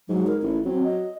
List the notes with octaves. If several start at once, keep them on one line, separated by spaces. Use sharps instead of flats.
G#2 F#3
A#4
A1 E4
F#3 C4
D#5